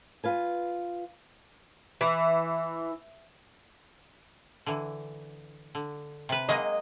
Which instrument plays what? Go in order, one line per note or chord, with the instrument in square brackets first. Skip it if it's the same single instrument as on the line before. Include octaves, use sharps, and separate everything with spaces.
[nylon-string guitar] F4 B4 G#5
[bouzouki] E3
[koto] D3 E3
D3
C3 B4
[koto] F#3 G#3 A#3 [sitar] D#5